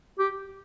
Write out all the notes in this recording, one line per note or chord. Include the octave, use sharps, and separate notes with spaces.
G4